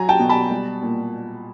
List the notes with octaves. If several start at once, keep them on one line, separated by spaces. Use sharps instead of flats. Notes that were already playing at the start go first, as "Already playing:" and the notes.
Already playing: F#3 G#5 A#5
G5 A5
B2
A5 B5
G3
A#2